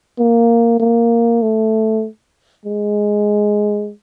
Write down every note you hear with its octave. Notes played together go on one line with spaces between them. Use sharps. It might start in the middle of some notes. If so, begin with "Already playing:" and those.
A#3
A#3
A3
G#3